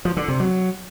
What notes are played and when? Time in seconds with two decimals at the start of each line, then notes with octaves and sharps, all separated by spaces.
0.05 F3
0.17 D3
0.28 C3
0.40 F#3